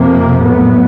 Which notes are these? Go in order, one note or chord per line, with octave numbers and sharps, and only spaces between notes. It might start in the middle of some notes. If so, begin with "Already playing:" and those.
Already playing: F2 C3 F3 A#3
A2 F#3 B3